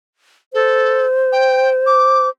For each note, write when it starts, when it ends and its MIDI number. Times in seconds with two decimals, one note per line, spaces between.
0.54 1.06 69
0.54 2.30 72
1.32 1.70 79
1.86 2.28 86